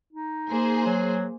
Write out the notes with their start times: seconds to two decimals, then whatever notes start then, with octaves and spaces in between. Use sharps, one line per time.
0.13 D#4
0.49 A#3 G#4 C5
0.86 F#3